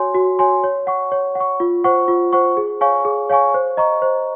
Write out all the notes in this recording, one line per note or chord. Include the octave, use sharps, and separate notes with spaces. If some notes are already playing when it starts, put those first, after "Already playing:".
Already playing: F#4 C#5 G#5 C6
F#4
C#5 G#5 C6
C#5
F#5 C#6
C#5
F#5
C#6
F4
C5 F#5 C#6
F4
C5 F#5 C#6
G#4
C#5 F5 G#5 C#6
G#4
C#5 F5 G#5 C#6
C5
D#5 A#5 C#6
C5